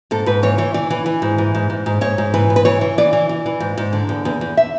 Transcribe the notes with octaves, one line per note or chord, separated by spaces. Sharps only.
G#2 A4
G#2 B4
E3 C#5
E3 C#5
E3 D5
E3
E3
G#2
E3
G#2
G#2
G#2
G#2 C#5
G#2
E3 B4
G#2
B4
E3 C#5
E3
E3 D5
E3
E3
E3
G#2
G#2
D3
E2
E2
E2
E5